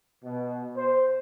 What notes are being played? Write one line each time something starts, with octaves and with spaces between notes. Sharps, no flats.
B2
C5